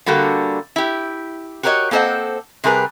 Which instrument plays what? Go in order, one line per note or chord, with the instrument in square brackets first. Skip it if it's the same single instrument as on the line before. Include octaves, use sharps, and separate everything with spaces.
[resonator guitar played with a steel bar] D3 G3 A#3 F#4 A4
E4 G4
F#4 G4 A#4 B4 C#5 D#5
A#3 C4 A4 C5 D#5 F#5
C3 G3 G#4 A#4 B4